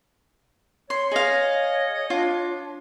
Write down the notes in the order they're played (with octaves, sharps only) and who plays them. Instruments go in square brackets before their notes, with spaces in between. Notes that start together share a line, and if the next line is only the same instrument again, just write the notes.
[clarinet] C#5 [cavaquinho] C6
[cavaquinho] G#4 F5 [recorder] D#5
[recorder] D4 [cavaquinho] F4